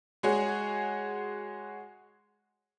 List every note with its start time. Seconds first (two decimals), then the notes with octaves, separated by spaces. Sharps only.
0.23 G#3 F#4 G#4 C#5